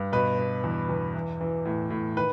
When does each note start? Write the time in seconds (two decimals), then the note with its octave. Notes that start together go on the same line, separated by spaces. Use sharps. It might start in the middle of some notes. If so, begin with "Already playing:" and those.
Already playing: G2
0.12 B2 B4
0.38 B2
0.64 E2
0.89 E2
1.14 E3
1.41 E3
1.65 A2
1.90 A2
2.17 D#3 B4